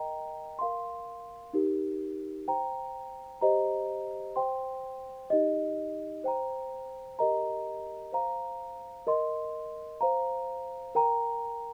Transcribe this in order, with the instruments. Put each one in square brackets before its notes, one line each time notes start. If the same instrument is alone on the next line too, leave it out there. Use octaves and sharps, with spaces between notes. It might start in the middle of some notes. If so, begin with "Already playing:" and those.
Already playing: [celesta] A#4 D#5 G5 A#5
A#4 F5 C6
D#4 G4 A#4
C5 G5 A#5
G4 C5 D#5 A#5
C5 G5 C6
D#4 G4 D#5
C5 G5 A#5
G4 A#4 D#5 A#5
C5 F5 A#5
A#4 D#5 C6
C5 F5 A#5
A#4 G5 A#5